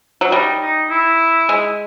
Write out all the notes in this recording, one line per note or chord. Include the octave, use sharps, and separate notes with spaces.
F#3
G3 D#4
D#4
E4
G#3